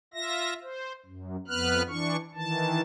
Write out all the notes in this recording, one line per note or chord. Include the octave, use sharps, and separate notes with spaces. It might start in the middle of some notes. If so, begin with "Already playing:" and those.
F4 E5 A#6
C5
F#2
F2 B3 B4 F6 F#6
E3 D4 C#6
D#3 E3 A5